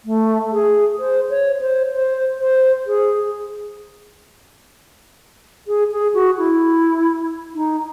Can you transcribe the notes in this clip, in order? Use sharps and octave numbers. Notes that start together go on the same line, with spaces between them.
A3
G#4
C5
C#5
C5
C5
C5
G#4
G#4
G#4
F#4
E4
D#4